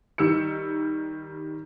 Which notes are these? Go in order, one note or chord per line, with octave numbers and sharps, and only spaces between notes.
D#3 G3 E6 C#7